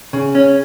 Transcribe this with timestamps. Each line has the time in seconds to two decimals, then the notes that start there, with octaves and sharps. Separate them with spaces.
0.13 C#3
0.35 C#4